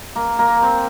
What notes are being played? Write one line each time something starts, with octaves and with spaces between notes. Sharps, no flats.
A#3
A#3
C4